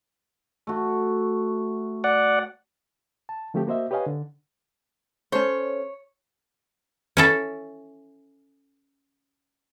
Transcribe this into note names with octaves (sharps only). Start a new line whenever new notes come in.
A3 F#4
D5 F#5
A5
D3 F3 A3 C4 G4
A#3 F#4 C5 D#5 E5
G4 B4 C#5 D#5 F5 G#5
D3
C#4 A4 C5 C#5
C#4 E4 A4